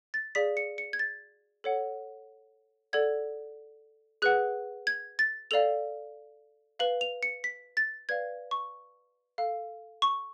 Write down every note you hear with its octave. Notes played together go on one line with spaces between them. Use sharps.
A6
G#4 D5 F5 B6
C#7
C#7
G#6
A6
A4 C#5 F#5
A4 D5 F#5 G#6
G#4 B4 F#5 F#6
G#6
A6
A4 D5 F5 F7
B4 F5 F#7
F7
C#7
B6
A6
B4 D5 F5 G#6
C#6
A4 F5
C#6